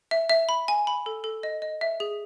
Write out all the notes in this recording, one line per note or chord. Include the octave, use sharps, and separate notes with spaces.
E5
E5
B5
G#5
B5
A4
A4
D#5
D#5
E5
G#4